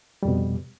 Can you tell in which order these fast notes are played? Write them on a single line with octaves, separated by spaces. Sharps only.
G3 F2 B2